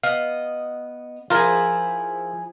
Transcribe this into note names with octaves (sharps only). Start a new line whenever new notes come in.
B3 D#5 F5
F3 E4 F4 G#4 A#4